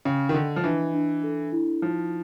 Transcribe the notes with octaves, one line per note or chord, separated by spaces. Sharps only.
C#3 G5
D#3
D3 D#5
F3
E3 D4
D4
A4
E4
F3 D#4